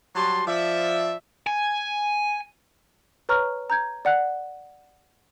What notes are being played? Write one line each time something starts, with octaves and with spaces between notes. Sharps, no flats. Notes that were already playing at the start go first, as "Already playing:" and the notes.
F#3 G3 F#4 A5 C6
F3 D5 E5
G#5
B4 C#5 A#5 C#6 F6
A#5 G6 G#6
D5 F#5 F#6